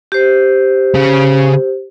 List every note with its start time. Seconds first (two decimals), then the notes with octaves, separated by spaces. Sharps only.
0.12 G4 C5
0.95 C#3 C#4